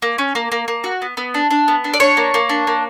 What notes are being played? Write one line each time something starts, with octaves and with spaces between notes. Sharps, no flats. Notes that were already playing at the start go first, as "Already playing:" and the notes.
A#3
C#4
A#3
A#3
A#3
F#4
B3
B3
D4
D4
B3
D4
D5
D4 C#5
A#3
A#3
D4
A#3